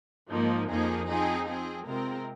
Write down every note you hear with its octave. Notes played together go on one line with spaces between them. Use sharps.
G#2 F3 A#3 D#4
F2 F3 A#3 D#4 G#4
F3 C4 D#4 G#4
F3 C4 G#4
C3 G#3 C4 F4 A#4